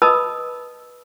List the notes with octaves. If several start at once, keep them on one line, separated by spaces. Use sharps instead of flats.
B4 D#5 A5 B5 D#6 E6